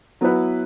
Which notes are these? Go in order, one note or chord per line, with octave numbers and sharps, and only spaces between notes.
F#3 B3 E4 B4